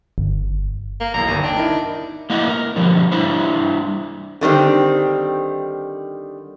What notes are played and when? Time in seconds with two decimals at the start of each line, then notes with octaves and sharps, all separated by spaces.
0.18 G1
1.00 A#3
1.14 B1 E2 A#5
1.28 G1 D#2
1.43 D4 G5
1.56 D#4 E4 A#4
2.30 A3 A#3 E4 D#5 F#5
2.48 A#4
2.76 B2 D3 F3 G3 B3
3.12 G3 D4 E4 C5
4.41 D3 D#3 G3 C4